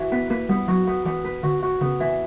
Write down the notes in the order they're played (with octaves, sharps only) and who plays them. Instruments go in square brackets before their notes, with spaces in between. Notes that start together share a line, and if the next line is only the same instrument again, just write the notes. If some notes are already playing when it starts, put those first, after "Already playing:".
Already playing: [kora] E3 F#4
[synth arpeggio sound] B3 [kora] B4
[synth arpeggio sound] A#3 [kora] B4
[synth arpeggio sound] G3 [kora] B3
[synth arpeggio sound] F#3 [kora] F#4
[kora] B3
[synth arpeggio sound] E3 [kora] B3
[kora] B4
[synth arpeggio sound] D3 [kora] F#4
[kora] F#4
[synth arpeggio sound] C#3 [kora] B3
[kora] E3